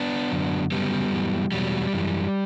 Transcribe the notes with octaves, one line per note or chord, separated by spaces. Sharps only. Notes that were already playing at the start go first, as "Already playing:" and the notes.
Already playing: B3 D4
F#2 D3 F#3
F#2 C#3 F#3 G3 B3
F#2 E3
E2 B2 F#3 G3
F#2 E3